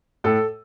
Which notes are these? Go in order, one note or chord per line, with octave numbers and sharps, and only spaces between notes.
A2 A4